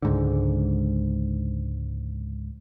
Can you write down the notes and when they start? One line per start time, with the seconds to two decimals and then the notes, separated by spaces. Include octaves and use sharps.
0.02 C#2 G#2 D3